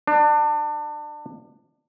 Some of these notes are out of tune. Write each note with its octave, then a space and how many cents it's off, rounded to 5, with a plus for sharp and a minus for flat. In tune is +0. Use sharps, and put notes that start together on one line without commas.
D4 +25